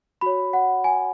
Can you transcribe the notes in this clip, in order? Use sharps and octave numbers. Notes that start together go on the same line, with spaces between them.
F#4 C#5 B5
F#5
G#5